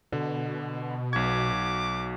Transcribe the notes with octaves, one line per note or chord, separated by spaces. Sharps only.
B2 D3
B1 F#4 D6 G#6